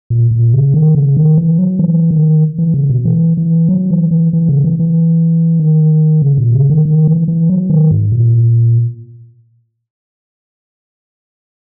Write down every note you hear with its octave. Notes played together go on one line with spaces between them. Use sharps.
A#2
A#2
C#3
D#3
C#3
D#3
E3
F#3
E3
D#3
E3
C#3
B2
E3
E3
F#3
E3
E3
E3
C#3
E3
E3
D#3
C#3
A#2
C#3
D#3
D#3
E3
E3
F#3
D#3
G#2
A#2